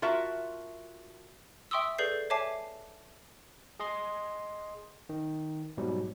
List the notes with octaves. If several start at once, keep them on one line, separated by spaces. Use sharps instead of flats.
F4 F#4 A#4 E5 A5
E5 G5 C6 C#6 D#6 E6
G#4 A4 B4 D5 G6 C7
C#5 E5 G#5 A5 D6 C7
G#4 D#5 C6
D#3
G#2 B2 F#3 G3